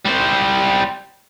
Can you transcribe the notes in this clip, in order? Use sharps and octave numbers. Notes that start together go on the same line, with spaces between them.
G3 C5